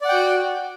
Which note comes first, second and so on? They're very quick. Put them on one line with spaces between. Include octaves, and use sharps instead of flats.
D5 F#5 G5 F#4